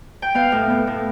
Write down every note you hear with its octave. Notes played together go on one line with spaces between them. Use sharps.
G5
B3 F5
A2
B3
A2